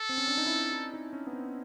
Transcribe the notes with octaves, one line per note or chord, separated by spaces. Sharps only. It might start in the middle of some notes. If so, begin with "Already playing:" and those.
Already playing: A4
C4
C#4
D4
D#4
E4
E4
D#4
C#4
B3
C4